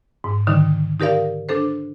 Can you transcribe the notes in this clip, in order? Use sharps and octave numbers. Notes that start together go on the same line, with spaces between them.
G#2
D3 D#3 G3 D#4
D#4 G4 A#4 D5 F5
D4 A4 C5